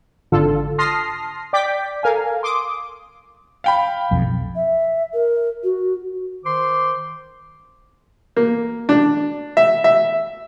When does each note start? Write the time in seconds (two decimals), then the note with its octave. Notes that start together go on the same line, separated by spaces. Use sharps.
0.32 G#1 D3 F4 A4
0.78 A5 C6 D#6 F6 A#6 C7
1.53 D5 G5 D6 G6 B6
2.03 A4 A#4 F5 G#5
2.43 C6 D6 D#6
3.64 F5 G5 B5
4.11 B1 F2
4.56 E5
5.14 A#4
5.64 F#4
6.44 D#3 C5 C6 D6
8.37 A#3
8.89 D4
9.57 E5
9.84 E5